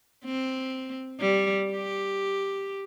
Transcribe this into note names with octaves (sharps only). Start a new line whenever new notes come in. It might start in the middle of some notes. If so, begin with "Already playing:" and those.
C4
G3
G4